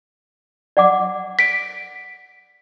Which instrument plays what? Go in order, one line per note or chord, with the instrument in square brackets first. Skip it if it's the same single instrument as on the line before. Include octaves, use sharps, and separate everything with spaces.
[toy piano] D5 F#5 D6
[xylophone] B6 D7